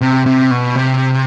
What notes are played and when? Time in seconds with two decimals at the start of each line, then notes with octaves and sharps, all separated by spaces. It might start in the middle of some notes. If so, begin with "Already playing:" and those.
0.01 C3
0.26 C3
0.51 B2
0.75 C3